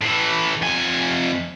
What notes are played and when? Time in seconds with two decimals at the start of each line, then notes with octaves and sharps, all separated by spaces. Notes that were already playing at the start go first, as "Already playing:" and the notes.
0.01 A2 E3
0.62 F2 G#5